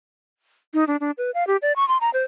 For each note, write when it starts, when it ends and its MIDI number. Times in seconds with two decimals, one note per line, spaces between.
0.74 0.84 63
0.87 0.97 62
1.01 1.11 62
1.18 1.31 71
1.34 1.46 77
1.47 1.57 67
1.62 1.73 74
1.76 1.87 85
1.88 1.97 84
2.01 2.10 82
2.13 2.23 72